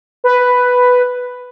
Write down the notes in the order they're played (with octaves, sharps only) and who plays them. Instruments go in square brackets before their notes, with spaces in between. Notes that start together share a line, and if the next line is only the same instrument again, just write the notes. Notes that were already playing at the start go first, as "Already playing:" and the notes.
[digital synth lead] B4